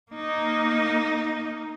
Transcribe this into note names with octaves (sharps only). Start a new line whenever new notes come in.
A#3 D#4